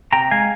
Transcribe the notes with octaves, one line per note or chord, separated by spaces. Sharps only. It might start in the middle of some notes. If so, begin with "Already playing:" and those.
C3 G5 A#5
G#3 F5 G#5